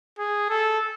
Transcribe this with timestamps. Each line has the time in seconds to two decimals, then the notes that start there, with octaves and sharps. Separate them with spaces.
0.19 G#4
0.49 A4